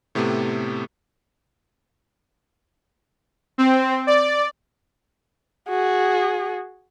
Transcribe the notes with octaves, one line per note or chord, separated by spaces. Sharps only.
A2 C3 A3 B3 G4 A4
C4
D5
F#4 G#4